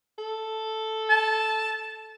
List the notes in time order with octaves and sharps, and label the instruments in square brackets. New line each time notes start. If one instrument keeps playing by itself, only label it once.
[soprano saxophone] A4
[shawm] A5